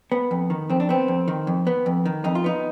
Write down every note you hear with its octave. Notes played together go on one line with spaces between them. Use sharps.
B3
F2
D#3
F2 C4
D4
B3 C4
F2
D#3
F2
B3
F2
D#3
F2 D#4
F4
B3 D#4